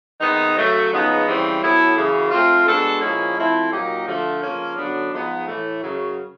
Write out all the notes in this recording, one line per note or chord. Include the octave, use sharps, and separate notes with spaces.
C3 D#3 G#3 B3 D#4
C#3 F#3 A3
C#3 F3 G#3 B3 D#4
C#3 E3 G3 C4
A2 F#3 B3 E4 A4
F#2 C#3 E3
A3 C4 F4
G#3 B3 D4 F#4 A4
A#2 F3 G#3 C#4 E4
F3 A3 C4 E4
A#2 F#3 A#3 D#4 G4
D3 F3 A3
C#3 F3 A#3 C#4
F#2 D3 F#3 B3 D4
G#2 F3 G#3 B3 D#4
A2 E3 A3
F#2 C#3 F#3